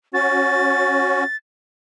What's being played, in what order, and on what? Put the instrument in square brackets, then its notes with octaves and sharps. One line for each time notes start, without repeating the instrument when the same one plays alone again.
[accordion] C#4 F#4 [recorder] A6